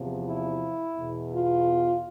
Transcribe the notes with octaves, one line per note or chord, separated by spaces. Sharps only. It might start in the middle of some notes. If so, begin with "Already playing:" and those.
Already playing: E2 C3 F3
E4
E2 B2
F4